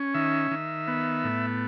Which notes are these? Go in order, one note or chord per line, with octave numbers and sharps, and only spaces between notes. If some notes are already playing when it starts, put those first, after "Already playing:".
Already playing: C#4
D#3 E5
D#3
B3
A2